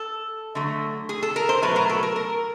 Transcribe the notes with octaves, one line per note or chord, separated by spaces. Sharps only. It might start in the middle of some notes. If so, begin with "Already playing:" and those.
Already playing: A4
D3 F#3 A3
G#4
A4
A#4
C5
B2 F#3 A3 B4
A#4
A4
A#4
A#4